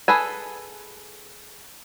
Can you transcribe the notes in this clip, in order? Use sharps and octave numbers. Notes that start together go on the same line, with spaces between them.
G#4 A4 B4 G#5